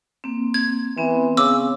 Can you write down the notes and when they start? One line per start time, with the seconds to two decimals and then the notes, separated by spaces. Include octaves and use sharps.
0.24 A#3 C4
0.54 G#6
0.97 E3 B3 C4
1.37 C#3 D6 E6